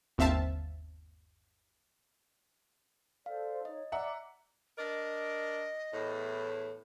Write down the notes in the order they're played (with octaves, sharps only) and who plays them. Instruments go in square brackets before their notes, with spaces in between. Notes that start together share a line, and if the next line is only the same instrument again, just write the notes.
[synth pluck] G1 D#2 C4 E5 F5 A5
[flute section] A4 C5 D5 [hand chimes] F5
[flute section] D#4 C#5 [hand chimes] D#5
[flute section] D5 D6 [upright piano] E5 F#5 [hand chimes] A#5
[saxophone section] D4 A#4 D5 [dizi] D#5
[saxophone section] E2 A2